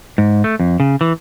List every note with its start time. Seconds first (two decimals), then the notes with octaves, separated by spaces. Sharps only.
0.18 G#2
0.44 A3
0.60 F2
0.80 C#3
1.01 E3